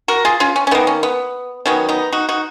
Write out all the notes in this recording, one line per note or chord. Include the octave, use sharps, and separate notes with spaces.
F#4 A#4
F4 G#4
C#4 F4
C#4
C#4
D#3 A#3 B3
C#4
B3
D#3 F#3 B3 C#4
B3 D#4
D#4 F#4
D#4 F#4